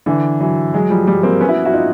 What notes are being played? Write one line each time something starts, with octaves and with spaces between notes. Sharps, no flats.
D3 E3
E3 F#3
F#3 G#3
F3 G3
F3 G3
A#3 C4
B3 C#4
E4 F#4
E4 F#4
D#4 F4